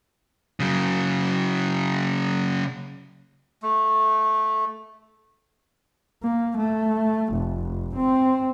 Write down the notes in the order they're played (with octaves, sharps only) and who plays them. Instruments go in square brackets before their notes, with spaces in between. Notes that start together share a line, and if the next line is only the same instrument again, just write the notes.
[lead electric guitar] C#3 F#3
[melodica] A3
[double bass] A#3
A3
F1
C4